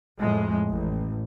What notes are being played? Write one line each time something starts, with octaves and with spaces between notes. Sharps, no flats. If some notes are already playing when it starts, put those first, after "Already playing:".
F2 A2 G#3
A1